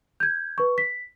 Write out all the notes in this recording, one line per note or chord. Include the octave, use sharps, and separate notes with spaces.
G6 G#6
B4 C#6
B6